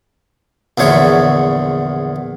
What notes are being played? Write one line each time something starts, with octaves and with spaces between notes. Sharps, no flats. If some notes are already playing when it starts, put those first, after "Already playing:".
A#1 E2 D3 C#5 E5